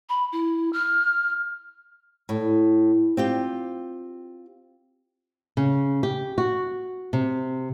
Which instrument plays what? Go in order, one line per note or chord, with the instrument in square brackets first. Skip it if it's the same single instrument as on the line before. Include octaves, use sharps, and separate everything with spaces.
[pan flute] B5
E4
F6
[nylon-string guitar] A2
C4 F4 G4
C#3
G4
F#4
C3